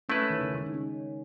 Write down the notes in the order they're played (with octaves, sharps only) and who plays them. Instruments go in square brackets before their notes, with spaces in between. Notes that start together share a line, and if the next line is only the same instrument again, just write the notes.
[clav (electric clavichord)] A3 E4 B4 [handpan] C#4
[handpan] D#3
C#3
D#3
G#3
D#4
C#4